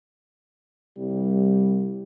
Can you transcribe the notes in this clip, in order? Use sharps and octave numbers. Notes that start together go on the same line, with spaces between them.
C2 G3